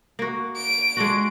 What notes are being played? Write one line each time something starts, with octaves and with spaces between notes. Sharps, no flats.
A#3 F#4
D7
G#3 D4 F#4